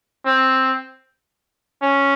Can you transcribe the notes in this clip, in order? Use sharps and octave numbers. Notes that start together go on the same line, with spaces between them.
C4
C#4